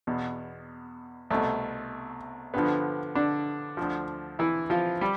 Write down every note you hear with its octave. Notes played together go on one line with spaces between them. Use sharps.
E2 B2
C2 B2 A3
G2 D3 F3 B3
D3 D4
D2 D3 F3
E3 E4
F3 F4
G3 G4